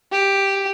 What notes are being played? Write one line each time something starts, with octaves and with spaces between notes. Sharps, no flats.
G4